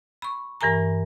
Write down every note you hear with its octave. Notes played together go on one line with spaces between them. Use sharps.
B5 C#6
G2 E3 A#4 G#5 A#5